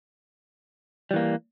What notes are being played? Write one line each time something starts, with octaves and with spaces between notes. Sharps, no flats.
E3 G3 A#3